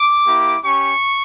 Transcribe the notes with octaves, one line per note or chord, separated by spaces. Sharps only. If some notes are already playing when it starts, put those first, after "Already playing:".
Already playing: D6
A#3 E4 G4
C#4 G4 C#6